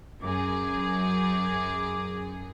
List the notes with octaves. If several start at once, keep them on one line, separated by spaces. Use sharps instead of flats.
F#2 G#4 D6